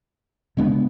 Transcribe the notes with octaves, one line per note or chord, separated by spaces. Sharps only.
C#3 G#3 B3 D4